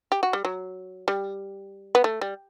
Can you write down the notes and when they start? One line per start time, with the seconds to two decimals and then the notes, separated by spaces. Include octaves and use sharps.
0.12 G4
0.23 F#4
0.33 G3
0.45 F#3
1.08 G3
1.95 B3
2.04 A3
2.21 G3